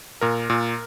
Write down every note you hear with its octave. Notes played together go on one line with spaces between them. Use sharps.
A#2 A#4
A#2